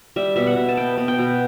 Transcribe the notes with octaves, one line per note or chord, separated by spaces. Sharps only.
G3 E5
B2 E5
F#5
B2
A5
B3 G5
B3
G5
B2